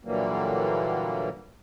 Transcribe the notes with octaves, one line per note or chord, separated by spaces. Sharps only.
A#2 D3 E3 F#3 G3 A#3